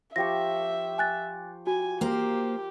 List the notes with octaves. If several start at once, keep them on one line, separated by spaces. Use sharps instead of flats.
F3 G4 E5 C#6 A#6
G#5 F#6 A6
F#4 G#5
A#3 G4 A#4 C5 A#5